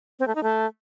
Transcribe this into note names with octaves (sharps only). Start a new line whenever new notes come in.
C4
A3
D#4
A3